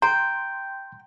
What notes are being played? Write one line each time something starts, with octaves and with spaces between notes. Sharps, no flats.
G5 A#5 C6